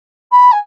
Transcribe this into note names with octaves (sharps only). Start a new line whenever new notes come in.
B5
G#5